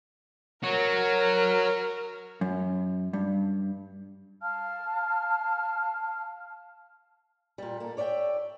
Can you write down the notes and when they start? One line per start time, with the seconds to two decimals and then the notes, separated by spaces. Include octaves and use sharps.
0.63 F#4 A#4 C#5
2.41 F#2
3.13 G2
4.41 F5 A5 F6
7.58 A#2 G3
7.80 A#3 A4
7.97 C#5 D5 E5 F5 G5